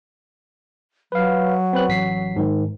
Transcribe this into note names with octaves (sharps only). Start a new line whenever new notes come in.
F#3 B4 F5
C4 B4 F#6
A1 B6 C7
G#2 D#3